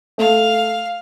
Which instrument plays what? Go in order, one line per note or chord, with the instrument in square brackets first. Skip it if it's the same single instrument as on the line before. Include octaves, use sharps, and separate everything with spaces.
[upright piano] A3 [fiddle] F5